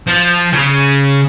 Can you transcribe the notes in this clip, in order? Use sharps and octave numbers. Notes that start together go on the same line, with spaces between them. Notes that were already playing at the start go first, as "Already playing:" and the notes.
F3
C#3